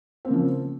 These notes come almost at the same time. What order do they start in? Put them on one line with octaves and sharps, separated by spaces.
C4 A#3 C#3 F3